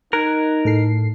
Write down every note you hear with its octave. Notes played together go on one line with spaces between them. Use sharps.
D#4 A#4 F#6 G#6
A2 A4 C7